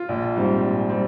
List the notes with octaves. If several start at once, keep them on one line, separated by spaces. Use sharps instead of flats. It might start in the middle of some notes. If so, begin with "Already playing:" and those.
Already playing: F4
A#1
G#2 G3 C4
A#1
G3 C4